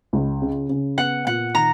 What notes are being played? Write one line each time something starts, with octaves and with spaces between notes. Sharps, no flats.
C#2
C#3
C#3
B3 F#5
A#2 F#5
D#3 A#5